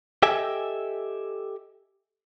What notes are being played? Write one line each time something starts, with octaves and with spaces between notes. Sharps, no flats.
G4 A4 D#5 E5 G5 G#5